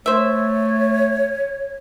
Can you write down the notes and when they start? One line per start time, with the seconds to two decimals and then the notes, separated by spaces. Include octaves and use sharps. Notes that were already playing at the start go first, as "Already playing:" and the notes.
0.06 A3 C5 C#5 E5